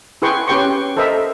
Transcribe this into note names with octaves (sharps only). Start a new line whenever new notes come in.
E4 G#4 B4 G5 C6 C#6
C#4 G4 B4 G5 C6 C#6
A4 A#4 C5 D#5 E5